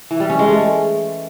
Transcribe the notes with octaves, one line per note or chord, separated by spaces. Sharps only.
E3
G3
C#4
G#3
A3